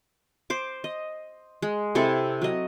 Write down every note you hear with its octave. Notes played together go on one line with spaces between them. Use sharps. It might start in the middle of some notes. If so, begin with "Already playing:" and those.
C5 D6
D#5
G#3
C3 C4 E4 A4
F#3 D#5